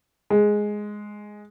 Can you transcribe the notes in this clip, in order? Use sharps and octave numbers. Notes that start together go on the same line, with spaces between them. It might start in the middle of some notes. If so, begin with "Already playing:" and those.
G#3